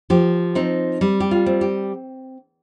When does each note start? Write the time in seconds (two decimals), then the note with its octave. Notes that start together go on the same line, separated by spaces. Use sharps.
0.10 F3 G4
0.55 C4 D#4
1.01 G3
1.20 G4
1.31 F4
1.46 C4
1.61 G4